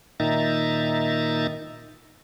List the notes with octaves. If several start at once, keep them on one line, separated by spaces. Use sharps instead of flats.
A#2 D#3 D#4 E5 A#5 A6